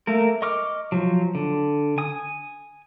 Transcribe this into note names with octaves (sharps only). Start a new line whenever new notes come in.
A3 A#3 A#4
D#5 C#6 D6 F6
F3 F#3
D3
G#5 D#6